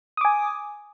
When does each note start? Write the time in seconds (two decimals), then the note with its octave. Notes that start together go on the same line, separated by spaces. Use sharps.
0.17 D#6
0.21 D6
0.25 G#5